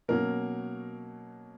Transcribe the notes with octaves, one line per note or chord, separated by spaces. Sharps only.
B2 F#3 A#3 C#4 A#4